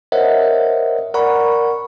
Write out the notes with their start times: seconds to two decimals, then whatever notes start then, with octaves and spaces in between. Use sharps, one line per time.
0.12 A#4 C5 C#5 D#5 E5 F#5
1.14 A#4 D5 F#5 A#5 B5 C#6